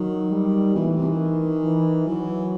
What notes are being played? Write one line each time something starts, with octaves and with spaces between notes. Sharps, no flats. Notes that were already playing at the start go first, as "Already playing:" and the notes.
Already playing: D#3 F#3
G3
B2 E3
A2
C3
D#3
E3
E3 F#3